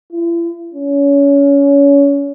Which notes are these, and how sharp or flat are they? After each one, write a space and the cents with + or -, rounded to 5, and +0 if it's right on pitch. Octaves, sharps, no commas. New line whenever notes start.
E4 +40
C#4 +25